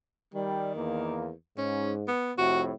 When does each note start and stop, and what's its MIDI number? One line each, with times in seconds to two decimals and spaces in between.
0.34 1.32 51
0.34 0.74 55
0.75 1.32 40
0.75 1.32 58
1.58 2.09 44
1.58 1.92 61
2.08 2.33 59
2.38 2.73 41
2.38 2.73 45
2.38 2.73 48
2.38 2.62 66